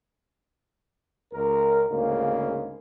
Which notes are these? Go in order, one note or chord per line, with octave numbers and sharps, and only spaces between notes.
C#2 A#4
D2 G#2 C#3 A#3